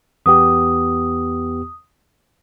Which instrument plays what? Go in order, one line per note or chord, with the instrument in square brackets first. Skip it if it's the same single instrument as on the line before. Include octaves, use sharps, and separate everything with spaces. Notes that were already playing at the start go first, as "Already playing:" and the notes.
[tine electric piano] E2 B3 G4 [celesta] D#6